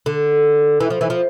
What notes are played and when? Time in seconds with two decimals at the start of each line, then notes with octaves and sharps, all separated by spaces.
0.06 D3
0.80 E3
0.90 F3
1.01 E3
1.10 F3